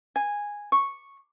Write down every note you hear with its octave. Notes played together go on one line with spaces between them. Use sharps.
G#5
C#6